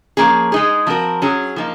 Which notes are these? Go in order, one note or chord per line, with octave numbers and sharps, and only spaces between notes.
F3 A#3 C#4 G#4
G#3 D#4 G#4
F3 C4 F#4 A#4
F#3 C#4 G#4
F3 A#3 D#4